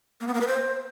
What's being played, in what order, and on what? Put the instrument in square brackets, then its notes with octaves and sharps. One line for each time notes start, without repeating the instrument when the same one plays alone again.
[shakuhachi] A#3
B3
A#3
B4
C5